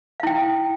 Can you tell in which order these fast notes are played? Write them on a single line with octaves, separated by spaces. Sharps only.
F5 E4 G5